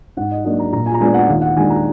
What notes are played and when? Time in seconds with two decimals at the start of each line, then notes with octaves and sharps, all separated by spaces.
0.17 G#2 F#5
0.31 D#5
0.44 F#3 A#3 D4 D#5
0.59 A#5
0.73 A#2 A#5
0.86 G#5
0.94 A#5
1.00 G#3 B3 D4 G#5
1.14 F#5
1.28 D#2 F5
1.42 F#5
1.56 D#3 G#3 D4 G#5
1.70 A#5